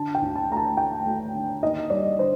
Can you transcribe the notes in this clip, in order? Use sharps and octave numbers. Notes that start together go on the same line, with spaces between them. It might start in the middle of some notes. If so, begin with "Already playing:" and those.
Already playing: D3 A5
G5
D2
A5
A3 A#5
A5
A3 G5
A3
D3
D#2 D#5
G3 D5
D3 C5